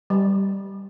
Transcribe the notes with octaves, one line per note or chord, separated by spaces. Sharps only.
G3